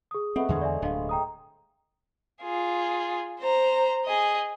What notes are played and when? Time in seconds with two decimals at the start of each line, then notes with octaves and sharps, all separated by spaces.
0.11 G#4 D#6
0.36 A3 B3 C4 D#5
0.49 E2 D3 G#3 C5 C#5
0.61 D5 E5 G#5
0.82 D1 G2 D4 D#5 F5
1.09 G5 A#5 D#6
2.42 F4 G#4
3.39 C5 A#5
4.06 G#4 D#5